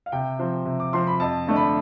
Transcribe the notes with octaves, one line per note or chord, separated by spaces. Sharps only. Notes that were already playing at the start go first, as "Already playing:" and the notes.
F5
C3 G5
F3 C4
C3
D6
F3 C4 C6
B5
F2 A5
D3 A3 D4
B5